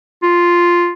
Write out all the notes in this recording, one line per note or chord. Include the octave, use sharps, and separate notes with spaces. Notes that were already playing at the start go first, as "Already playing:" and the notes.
F4